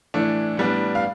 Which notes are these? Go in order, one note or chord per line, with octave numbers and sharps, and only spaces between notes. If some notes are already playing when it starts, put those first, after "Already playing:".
A2 E3 A3 D4
A2 G3 B3 D4
F5